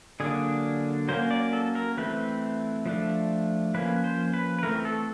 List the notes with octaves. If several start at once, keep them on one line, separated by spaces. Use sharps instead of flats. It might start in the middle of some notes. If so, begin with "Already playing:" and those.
D3 F#3 A#3 D4 G#4
F#3 A#3 C#4 C5
D5
A4
A#4
E3 A3 C4 B4
F3 A3 D4
F3 A#3 C#4 B4
C5
B4
B4
E3 A3 C4 A#4
A4